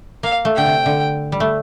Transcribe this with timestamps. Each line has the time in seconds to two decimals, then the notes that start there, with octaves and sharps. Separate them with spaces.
0.23 A#3 F5
0.45 A3
0.56 D3 G5
0.66 C3
0.86 D3
1.32 G3
1.40 A3